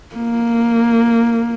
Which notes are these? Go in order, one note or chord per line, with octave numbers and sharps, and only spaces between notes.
A#3